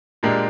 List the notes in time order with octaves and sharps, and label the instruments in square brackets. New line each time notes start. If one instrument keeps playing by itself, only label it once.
[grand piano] A#2 G#3 D4 G4 A#4